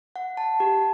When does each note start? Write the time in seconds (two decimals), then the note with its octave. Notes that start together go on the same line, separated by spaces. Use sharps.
0.16 F#5
0.37 A5
0.60 G4